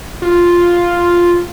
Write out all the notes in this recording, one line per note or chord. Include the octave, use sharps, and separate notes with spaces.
F4